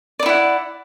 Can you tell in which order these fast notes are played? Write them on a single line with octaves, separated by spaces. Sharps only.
D5 D#4 E4 F#5